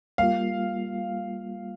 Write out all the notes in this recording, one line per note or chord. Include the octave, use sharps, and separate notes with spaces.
G3 A#3 F4 F5